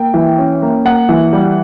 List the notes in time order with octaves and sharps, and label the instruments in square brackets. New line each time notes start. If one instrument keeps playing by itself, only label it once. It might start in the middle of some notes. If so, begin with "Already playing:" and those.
Already playing: [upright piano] A#3 G5
E3
C#4
A#3
A#3 F#5
E3
G3